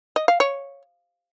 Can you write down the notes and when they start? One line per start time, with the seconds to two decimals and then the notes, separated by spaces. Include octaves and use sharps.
0.16 D#5
0.28 F5
0.40 C#5